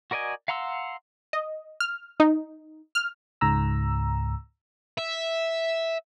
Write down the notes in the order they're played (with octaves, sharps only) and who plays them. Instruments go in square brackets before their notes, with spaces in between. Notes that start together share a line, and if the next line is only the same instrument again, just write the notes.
[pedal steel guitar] F#4 A#4 D5 D#5 G#5
F5 F#5 A#5 C6 E6
[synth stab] D#5
F6
D#4
F6
[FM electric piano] C#2 G#2 A#5 E6
[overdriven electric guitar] E5